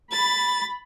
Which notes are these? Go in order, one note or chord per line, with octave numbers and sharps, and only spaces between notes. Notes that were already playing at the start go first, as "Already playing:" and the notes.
B5 A6